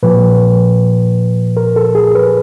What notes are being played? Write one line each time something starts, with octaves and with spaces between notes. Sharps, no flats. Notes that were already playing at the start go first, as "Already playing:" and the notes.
A#2 F3 B4
A#4
A4
G#4
B4